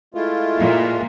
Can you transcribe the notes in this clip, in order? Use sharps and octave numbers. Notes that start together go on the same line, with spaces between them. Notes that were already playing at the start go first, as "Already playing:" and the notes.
G#3 A3 E4 F4
A#2